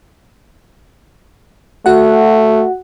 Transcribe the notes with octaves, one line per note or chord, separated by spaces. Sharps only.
A3 F#4 F#5